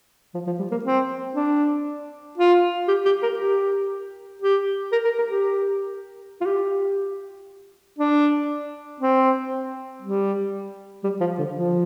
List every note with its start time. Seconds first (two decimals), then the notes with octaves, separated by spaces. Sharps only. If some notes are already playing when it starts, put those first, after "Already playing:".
0.34 F3
0.47 F3
0.59 G3
0.71 A#3
0.85 C4
1.36 D4
2.38 F4
2.88 G4
3.05 G4
3.23 A#4
3.39 G4
4.42 G4
4.92 A#4
5.05 A#4
5.19 A#4
5.31 G4
6.41 F4
6.46 G4
7.99 D4
9.00 C4
10.02 G3
11.04 G3
11.20 F3
11.39 D3
11.55 F3